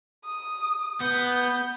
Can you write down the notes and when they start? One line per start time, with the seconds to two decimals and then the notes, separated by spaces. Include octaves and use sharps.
0.24 D#6
1.00 B3 G6